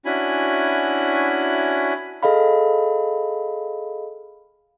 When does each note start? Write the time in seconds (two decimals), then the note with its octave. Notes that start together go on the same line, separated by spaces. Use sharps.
0.05 C#4 D4 E4 F#4 G#5 B5
2.23 G#4 A4 D#5 F5 B5